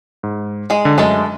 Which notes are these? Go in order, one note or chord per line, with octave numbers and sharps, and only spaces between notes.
G#2
G#3 G#4
D3
F#2 G#3 A3 A4